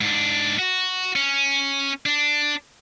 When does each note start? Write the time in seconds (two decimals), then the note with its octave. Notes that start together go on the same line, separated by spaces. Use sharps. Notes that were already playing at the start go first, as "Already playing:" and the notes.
0.01 G#2 D4
0.59 F#4
1.16 C#4
2.06 D4